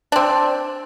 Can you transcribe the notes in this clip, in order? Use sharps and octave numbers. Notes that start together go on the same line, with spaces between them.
C4 D4